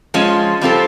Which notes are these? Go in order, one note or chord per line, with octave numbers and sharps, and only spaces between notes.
F3 G#3 C#4 F4
G3 C4 F4 A4